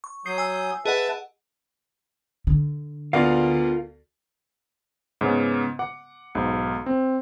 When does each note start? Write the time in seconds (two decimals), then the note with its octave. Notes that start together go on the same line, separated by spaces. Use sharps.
0.04 C#6
0.26 F#3 D#6 G6 C7
0.38 G#5 E6
0.86 G#4 B4 D#5 E5 F#5 A5
2.47 D3
3.13 D2 B3 F4 A#4 D5 F5
5.21 G#2 C#3 B3
5.79 F#5 D6
6.35 B1 G#2
6.86 C4